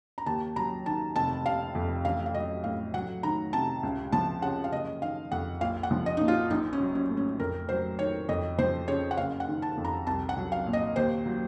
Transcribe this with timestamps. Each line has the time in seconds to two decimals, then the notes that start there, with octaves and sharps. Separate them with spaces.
0.18 A#5
0.26 D#2 A5
0.56 F#3 A#5
0.86 D#3 A5
1.15 F1 A5
1.46 C3 F5
1.75 F2
2.05 A1 F5
2.26 F5
2.34 F#3 D#5
2.64 A2 F5
2.94 F#3 F#5
3.23 D#3 A#5
3.53 C3 A5
3.83 C#2
4.12 F3 A5
4.42 C#3 F#5
4.64 F5
4.72 F#1 D#5
5.02 D#3 F5
5.32 F2 F#5
5.61 A#1 F5
5.83 F#5
5.91 F3
6.06 D#5
6.17 A#2 D#4
6.28 F4
6.50 A#1 D#4
6.73 C#4
6.80 F#3
6.95 C#4
7.10 A2
7.17 C#4
7.39 F2 A#4
7.69 F#3 C5
7.99 D#3 C#5
8.29 F2 D#5
8.58 F3 C5
8.88 C#3 C#5
9.11 F#5
9.17 F#1 F5
9.40 F#5
9.48 D#3
9.62 A5
9.78 F2
9.85 A#5
10.06 C2 A5
10.29 F#5
10.37 F#3
10.52 F5
10.66 A#2
10.73 D#5
10.96 D#2 C5
11.26 F#3